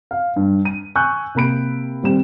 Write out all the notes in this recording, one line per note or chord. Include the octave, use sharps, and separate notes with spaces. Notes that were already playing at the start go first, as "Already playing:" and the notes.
F5
G2
D#7
G#5 C#6 E6 F#6 G6
C3 A#3 B5 D7
D#1 G3 C4 E7